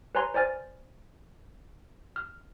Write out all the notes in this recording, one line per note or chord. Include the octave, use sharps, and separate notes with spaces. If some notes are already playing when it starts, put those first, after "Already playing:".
B4 C#5 G#5 A#5 C6
C5 D5 G#5 F6 A6
F6